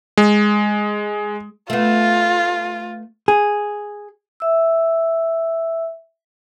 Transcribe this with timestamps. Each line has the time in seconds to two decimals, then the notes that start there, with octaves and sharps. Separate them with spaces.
0.17 G#3
1.70 A3 B3 F4
3.28 G#4
4.40 E5 E6